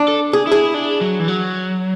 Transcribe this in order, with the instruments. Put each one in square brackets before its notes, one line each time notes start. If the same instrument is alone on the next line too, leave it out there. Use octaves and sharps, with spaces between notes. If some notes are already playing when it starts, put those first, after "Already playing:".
Already playing: [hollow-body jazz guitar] D4
[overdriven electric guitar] A4
[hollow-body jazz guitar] G#4
[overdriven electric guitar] E4 [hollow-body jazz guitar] G#4
[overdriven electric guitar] D4
F#3
E3
F#3